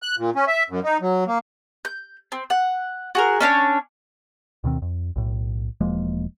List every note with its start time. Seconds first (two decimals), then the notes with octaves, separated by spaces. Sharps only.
0.02 F#6
0.18 A#2
0.36 C#4
0.48 E5
0.70 F#2
0.84 D#4
1.01 F#3
1.27 A#3
1.85 G6
2.32 C4
2.50 F#5
3.15 F#4 G#4 A#4
3.40 C#4 D4 A#4 C#5
4.64 D2 B2 D#3 C4
4.82 F2
5.16 B1 A2
5.81 E1 F3 G#3 A#3